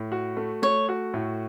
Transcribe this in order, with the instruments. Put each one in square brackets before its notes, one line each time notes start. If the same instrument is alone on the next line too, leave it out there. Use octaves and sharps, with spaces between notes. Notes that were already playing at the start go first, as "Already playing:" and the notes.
Already playing: [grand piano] A2
F#4
A3
[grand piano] A3 [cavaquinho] C#5
[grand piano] F#4
A2